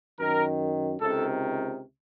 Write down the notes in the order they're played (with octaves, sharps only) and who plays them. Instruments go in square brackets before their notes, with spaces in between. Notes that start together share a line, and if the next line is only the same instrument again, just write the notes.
[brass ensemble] F#2 D#3 A#4
C#2 C3 D#3 A4